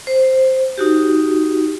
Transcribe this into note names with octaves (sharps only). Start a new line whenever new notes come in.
C5
D#4 F#4 G4